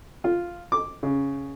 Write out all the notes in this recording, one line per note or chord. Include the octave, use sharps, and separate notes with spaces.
F4
D6
C#3